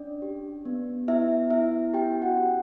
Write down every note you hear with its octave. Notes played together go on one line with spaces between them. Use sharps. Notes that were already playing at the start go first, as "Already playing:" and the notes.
Already playing: C#4 D4 D5
G4
B3
B3 E4 E5
B3 E4 E5
C#4 G4 G5
F#4 F#5
C#4